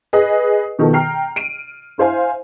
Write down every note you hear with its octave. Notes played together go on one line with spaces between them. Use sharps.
G#4 B4 D#5
B2 D#3 F3 A4
G5 A#5 F6 C7
D7 D#7
E4 C5 F5 G#5